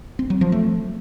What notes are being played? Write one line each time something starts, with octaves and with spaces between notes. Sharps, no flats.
C4
F#3
F3
A3